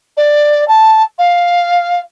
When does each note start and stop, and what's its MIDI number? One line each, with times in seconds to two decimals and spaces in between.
0.17 0.67 74
0.67 1.02 81
1.18 2.00 77